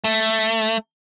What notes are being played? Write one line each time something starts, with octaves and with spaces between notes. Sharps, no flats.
A3